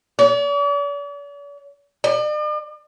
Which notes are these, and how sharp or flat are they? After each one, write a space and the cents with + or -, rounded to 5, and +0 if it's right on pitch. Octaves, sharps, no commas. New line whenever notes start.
D5 -45
D5 +45